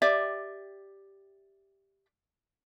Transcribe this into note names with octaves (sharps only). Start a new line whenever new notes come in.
G4 D5 E5